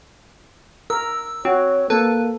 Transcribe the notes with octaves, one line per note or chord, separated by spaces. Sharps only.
A#4 E6
C4 F#4 C#5
A#3 A4 B4